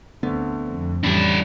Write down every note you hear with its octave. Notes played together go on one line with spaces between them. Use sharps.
D2 D3 A3 B3 C4
F2
A2 E3 G3 C#4 D4 E4